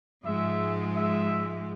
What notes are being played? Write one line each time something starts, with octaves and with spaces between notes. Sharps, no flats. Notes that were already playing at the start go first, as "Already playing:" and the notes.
G#2 F3 G#3 E5
E5